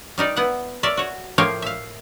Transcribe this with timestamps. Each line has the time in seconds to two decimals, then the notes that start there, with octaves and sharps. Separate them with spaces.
0.18 G3 D#4 A#4 D5
0.36 B3 E4 F#5
0.83 A#4 C#5 D5 E5
0.97 F#4 C#5
1.38 A2 F3 A#3 C#5 F5 G5
1.62 E5 F5